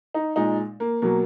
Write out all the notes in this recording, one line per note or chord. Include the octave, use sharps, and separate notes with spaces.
D#4
A#2 G#3 D#4
A#3
B2 F#3 A#3